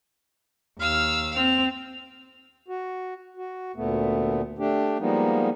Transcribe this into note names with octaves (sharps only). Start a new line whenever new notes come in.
D#2 F5 E6 F6
C4 F7
F#4
F#4
D2 A#2 A3 B3
A3 D4 G4
F3 G3 G#3 A#3 B3 D#4